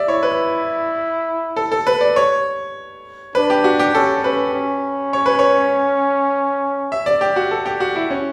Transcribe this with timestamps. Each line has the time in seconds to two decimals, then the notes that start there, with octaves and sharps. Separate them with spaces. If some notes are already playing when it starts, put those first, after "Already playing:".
Already playing: D5 E5
0.08 E4 C#5
0.23 B4
1.56 A4
1.72 A4
1.87 B4
2.01 D5
2.16 C#5
3.35 D4 B4
3.50 G4
3.64 F#4
3.79 G4
3.94 C#4 A4
4.24 C#4 B4
4.53 C#4
5.13 C#5
5.26 B4
5.39 C#5
6.92 E5
7.06 D5
7.21 G4
7.36 F#4
7.51 A4
7.66 G4
7.80 F#4
7.96 E4
8.10 C#4